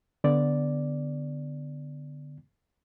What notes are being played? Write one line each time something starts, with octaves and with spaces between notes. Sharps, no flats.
D3 B3 D5